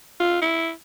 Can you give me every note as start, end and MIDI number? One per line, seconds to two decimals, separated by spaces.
0.20 0.38 65
0.42 0.71 64